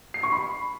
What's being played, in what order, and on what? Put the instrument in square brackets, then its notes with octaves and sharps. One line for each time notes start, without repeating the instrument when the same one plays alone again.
[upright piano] C7
C#6
B5